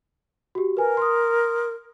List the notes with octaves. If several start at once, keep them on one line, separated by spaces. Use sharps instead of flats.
F#4 G4
A#4 B4 G#5
C6 D#6